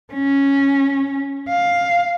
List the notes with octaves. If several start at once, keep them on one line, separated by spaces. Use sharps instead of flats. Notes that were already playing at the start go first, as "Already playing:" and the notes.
C#4
F5